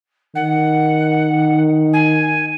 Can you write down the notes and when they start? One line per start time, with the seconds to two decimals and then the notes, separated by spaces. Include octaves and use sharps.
0.35 D#3 F#5
1.93 G#5